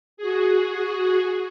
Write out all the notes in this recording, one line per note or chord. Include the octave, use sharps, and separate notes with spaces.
F#4 G#4